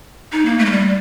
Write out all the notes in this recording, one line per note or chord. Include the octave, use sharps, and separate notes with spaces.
D#4
A#3
A3
G#3
G3